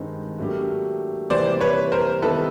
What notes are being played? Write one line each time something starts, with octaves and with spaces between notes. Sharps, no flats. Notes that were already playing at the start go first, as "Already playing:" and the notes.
Already playing: G2 D#3 G#3 C4 D#4
A2 F#3 A#3 D4 G4
C3 E3 G3 A#3 C5 D5
B4 C#5
A#4 C5
D#3 G3 B3 E4 G4 A4 B4